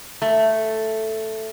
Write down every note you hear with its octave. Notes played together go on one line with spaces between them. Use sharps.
A3